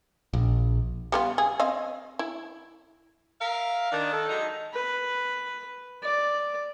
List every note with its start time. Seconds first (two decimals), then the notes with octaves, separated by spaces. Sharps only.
0.33 A#1
1.12 G3 B3 F4
1.38 G#4
1.60 C4 D#5 F5
2.19 E4
3.41 A#4 E5 F5
3.92 D#3 D4
4.13 A4
4.29 F#3 G#3 D#4
4.73 B4
6.03 D5